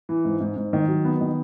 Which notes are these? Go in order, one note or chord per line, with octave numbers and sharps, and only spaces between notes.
E3
G#2
G#2
G#2
D#3
F#3
B3
D#3